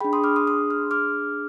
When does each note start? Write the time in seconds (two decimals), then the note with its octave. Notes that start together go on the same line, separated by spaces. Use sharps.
0.01 D4 G#4 G5 B5
0.13 C6 D#6
0.24 D6 F6
0.36 C6 D#6
0.47 C6 D#6
0.70 F6
0.91 D6 F6